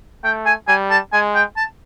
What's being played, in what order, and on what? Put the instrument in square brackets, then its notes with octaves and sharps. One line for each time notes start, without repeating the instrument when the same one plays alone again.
[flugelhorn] A3 [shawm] G5
[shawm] G#5
[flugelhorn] G3 [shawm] G#5
[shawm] A5
[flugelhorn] G#3 [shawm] G#5
[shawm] G5
A5